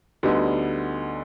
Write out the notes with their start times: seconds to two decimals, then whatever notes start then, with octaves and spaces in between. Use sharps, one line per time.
0.23 D2 D3 G3 B3 D#4